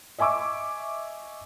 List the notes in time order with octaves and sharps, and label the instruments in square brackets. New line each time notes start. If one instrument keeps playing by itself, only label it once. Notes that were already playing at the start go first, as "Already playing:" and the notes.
[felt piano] D#5 E5 G#5 C#6 D6 E6